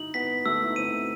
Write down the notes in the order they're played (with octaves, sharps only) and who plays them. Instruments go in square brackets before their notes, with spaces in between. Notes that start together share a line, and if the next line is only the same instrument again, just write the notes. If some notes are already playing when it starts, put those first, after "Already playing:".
Already playing: [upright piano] D#4 E4 [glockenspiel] F#7
[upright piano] B3 [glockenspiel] B6
[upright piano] A3 [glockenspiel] E6
[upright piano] E4
D#4
[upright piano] C4 [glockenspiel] D#7
[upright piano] B3
A3